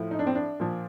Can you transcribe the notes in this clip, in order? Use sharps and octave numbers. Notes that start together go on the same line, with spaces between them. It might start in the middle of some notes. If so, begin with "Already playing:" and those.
Already playing: A2 F3
D#4
D4
C4
D4
A#2 F3